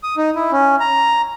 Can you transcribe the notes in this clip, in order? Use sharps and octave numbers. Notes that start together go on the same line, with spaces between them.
D#6
D#4
E4
C#4
A#5